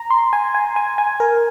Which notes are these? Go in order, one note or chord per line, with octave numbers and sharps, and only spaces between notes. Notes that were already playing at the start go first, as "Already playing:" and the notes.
Already playing: A#5
C6
G#5
G#5
G#5
G#5
A#4